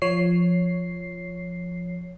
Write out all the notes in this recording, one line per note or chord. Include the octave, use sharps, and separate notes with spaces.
F3 C#5 C7